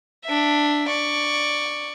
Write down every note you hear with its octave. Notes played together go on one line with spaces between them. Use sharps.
D4 E5
D5 C#6